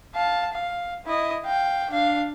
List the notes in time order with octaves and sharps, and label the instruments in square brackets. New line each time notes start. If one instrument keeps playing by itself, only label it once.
[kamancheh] F5 A5
F5
E4 D#5
F5 G5
D4 F5